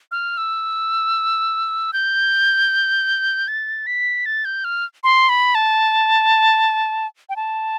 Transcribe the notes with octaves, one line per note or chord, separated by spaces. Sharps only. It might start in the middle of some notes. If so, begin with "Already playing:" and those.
F6
E6
G6
A6
B6
A6
G6
F6
C6
B5
A5
G5
A5